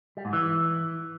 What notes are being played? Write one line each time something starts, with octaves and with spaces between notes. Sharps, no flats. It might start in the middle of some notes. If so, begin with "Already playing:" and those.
G3
G#2
E3